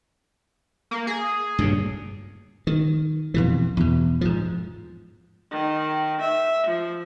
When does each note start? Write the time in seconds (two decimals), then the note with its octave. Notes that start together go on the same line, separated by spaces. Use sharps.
0.91 A#3
1.07 G#4
1.59 G2 A#2 C#3
2.67 D#3
3.34 F2 B2 E3
3.77 E2 B2
4.21 G#2 F3
5.51 D#3
6.22 E5
6.67 F3